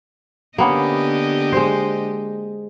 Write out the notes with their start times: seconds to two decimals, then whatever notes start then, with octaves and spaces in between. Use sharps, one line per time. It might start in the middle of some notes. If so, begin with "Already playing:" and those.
0.58 D3 A#3 B3 C#4 G4 D#5
1.52 G#3 C5